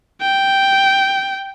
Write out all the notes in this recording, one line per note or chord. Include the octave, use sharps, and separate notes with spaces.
G5